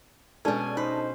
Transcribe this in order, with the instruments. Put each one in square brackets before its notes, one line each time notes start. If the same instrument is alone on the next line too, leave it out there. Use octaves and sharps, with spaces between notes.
[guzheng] B2 C#4 [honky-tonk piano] G#3 D4 A4 [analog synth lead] G#5
[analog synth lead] D#4 [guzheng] B4 [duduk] C5